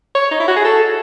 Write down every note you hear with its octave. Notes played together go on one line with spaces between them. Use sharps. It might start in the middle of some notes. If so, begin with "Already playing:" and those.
C#5
D#4
E4
F#4
G#4
A4